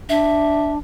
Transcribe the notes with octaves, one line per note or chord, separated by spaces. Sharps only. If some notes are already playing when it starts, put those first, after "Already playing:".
D4 E5